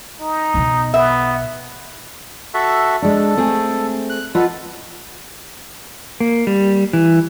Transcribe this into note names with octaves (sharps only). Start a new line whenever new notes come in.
D#4
B1 B2
B3 E5
F#4 A4 E5
G#3 D4 A4
A3 C4 G#4
F#6
F4 A4 B4 D#5 F#5
A#3
G3
E3